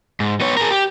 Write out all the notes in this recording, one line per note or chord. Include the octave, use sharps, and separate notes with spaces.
G#2
B3 C#5
G#4 A#4
G4